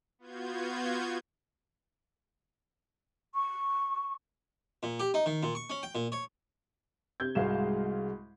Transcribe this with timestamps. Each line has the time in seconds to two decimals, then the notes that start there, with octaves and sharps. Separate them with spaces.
0.19 B3 F4 F#4 G6 G#6
3.34 C#6
4.83 A#2
5.00 G4
5.14 D#4
5.26 D#3
5.43 A#2
5.55 C#6
5.70 C#4
5.83 G5
5.95 A#2
6.12 C#5
7.20 C3 G6 G#6
7.35 C2 G#2 G#3 F#4 F5 E7